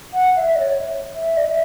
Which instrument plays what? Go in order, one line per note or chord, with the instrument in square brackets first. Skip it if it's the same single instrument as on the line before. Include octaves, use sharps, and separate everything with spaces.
[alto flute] F#5
E5
D5
C#5
E5
D5
E5